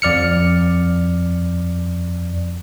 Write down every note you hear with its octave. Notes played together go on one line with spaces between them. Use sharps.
F2 D5 F6 C#7